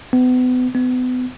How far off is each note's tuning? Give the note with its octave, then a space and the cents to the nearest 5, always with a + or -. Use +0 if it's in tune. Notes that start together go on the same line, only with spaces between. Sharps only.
B3 +35
B3 +35